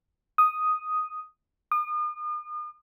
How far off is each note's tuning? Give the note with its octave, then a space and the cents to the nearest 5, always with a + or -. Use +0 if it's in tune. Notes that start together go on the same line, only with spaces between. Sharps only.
D#6 +0
D#6 -40